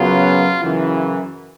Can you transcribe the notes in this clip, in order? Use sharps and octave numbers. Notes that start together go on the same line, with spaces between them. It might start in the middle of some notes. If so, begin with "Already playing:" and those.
Already playing: F#2 C#3 F#3 B3 F4
F#2 C#3 E3